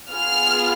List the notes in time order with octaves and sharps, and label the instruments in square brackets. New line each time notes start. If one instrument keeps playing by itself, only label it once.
[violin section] B3 F4 G#4 F6